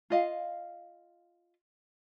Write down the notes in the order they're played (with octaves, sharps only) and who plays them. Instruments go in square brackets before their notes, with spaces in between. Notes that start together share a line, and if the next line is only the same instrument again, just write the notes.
[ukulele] F4 D#5 F5